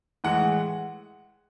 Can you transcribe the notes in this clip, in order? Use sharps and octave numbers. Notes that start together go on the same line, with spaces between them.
A2 E3 G#3 F#5